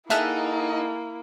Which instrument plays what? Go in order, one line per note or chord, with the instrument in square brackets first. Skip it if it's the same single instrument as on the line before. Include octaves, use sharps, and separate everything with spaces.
[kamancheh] A#3 E4 [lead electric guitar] D#4 [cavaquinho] G#4 A4 F#5 [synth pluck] E5 F6